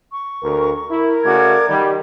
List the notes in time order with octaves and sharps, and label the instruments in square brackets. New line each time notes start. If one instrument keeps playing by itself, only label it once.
[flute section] C#6
[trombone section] D2 [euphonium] A#4
[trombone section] E4 [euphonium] A#4
[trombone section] C#3 A3 F#4 [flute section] D5 D6 G#6
[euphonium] D#3 [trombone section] G3